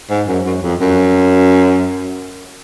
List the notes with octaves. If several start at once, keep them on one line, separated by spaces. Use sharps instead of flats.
G#2
F#2
F#2
F2
F#2